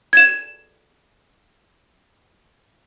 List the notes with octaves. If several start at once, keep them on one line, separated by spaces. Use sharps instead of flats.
G#6 E7